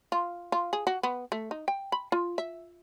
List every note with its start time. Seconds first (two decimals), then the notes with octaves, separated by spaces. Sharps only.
0.12 F4
0.52 F4
0.73 G#4
0.87 F#4
1.03 B3
1.32 A3
1.51 D#4
1.68 G5
1.92 B5
2.12 F4
2.38 E5